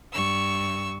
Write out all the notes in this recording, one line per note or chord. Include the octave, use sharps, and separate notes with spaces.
G2 C#6 E6